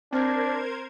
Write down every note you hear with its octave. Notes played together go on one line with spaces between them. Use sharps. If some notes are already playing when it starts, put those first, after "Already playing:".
C4 D4 A#4 C5 G#6